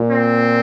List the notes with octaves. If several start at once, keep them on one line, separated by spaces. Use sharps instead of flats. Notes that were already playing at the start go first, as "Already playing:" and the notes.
Already playing: A#2
C4